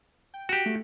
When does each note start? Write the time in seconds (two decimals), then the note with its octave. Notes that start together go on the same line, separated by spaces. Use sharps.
0.34 G5
0.49 F#4 G4
0.66 A3